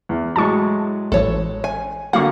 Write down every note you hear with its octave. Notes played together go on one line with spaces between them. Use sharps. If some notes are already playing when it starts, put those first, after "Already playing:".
E2
A2 F#3 G#3 A5 C#6
A1 E3 A4 C#5
G#5
D3 F#3 A#3 F5 F#5 C#6